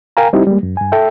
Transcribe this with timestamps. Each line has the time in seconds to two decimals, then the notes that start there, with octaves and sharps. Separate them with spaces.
0.17 A#4 F5 G5 G#5 A#5
0.33 G3 C4 D#4 E4 G4
0.47 G3 G#3 A#3
0.63 F#2
0.77 G2 G#5
0.92 A4 E5 G5